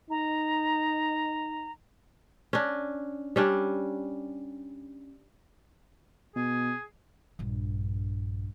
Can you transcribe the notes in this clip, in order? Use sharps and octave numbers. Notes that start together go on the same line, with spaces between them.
D#4 A#5
C#4 D4
G3 C#4 D4
B2 G#4
A#1 G2